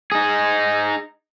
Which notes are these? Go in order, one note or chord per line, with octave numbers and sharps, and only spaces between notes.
D#4 G#4